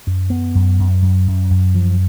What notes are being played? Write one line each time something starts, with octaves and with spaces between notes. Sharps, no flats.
F#2
B3
F#2
F#2
F#2
F#2
F#2
F3